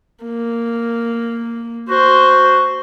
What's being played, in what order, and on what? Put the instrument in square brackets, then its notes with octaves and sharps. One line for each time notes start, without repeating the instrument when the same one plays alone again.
[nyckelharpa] A#3
[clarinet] F#4 [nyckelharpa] C5